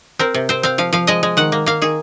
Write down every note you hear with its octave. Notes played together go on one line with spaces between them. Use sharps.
C4 A#4
C3
C4 C5
C4 F5
F3 F5
F3 F5
G#3 D#5
G#3
D#3 F#5
A#3
A#3 F5
D#3 G#4